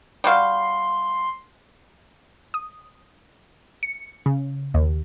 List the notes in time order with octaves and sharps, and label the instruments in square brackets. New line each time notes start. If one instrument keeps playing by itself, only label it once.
[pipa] G3 F#4 F5 [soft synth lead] C6
[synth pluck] D#6
C#7
C#3
D#2